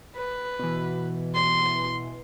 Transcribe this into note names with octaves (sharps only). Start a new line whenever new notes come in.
B4
B2 E3
C6